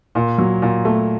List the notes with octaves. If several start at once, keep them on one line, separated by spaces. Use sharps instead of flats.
A#2
F#3
A#2
A3